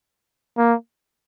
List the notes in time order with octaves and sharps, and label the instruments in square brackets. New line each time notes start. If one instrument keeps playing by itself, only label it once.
[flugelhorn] A#3